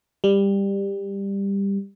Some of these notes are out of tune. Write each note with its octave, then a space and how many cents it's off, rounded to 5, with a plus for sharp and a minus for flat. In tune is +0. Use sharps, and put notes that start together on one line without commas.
G3 +15